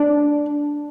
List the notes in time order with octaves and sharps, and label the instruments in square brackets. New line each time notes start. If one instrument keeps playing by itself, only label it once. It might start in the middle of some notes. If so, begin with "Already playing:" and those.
Already playing: [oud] D4